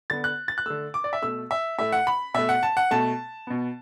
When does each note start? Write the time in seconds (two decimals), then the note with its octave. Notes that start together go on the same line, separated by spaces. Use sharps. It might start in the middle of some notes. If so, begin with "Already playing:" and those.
0.10 D3 B3 A6
0.24 F#6
0.48 A6
0.58 F#6
0.66 D3 A3 E6
0.94 D6
1.04 D5
1.13 E5
1.22 B2 A3 E6
1.51 E5
1.78 A2 A3 E5
1.92 F#5
2.07 B5
2.34 B2 A3 E5
2.49 F#5
2.63 A5
2.77 F#5
2.91 B2 A3 A5
3.47 B2 B3